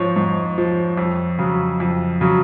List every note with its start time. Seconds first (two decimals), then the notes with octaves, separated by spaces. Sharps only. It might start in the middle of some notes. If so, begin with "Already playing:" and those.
Already playing: G#2 F3 C#5
0.16 G#2
0.58 F3
0.98 F2
1.39 C#3 F#3
1.80 F2
2.21 C#3 F#3